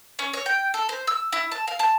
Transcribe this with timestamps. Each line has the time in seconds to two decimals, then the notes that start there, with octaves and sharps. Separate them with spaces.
0.19 C#4
0.33 C#5
0.46 G5
0.74 A4
0.89 C5
1.07 E6
1.32 E4
1.51 A5
1.67 F5
1.79 A5